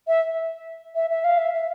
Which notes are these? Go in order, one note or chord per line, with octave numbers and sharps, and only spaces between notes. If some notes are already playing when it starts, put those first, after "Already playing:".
E5
E5
E5
F5
E5
E5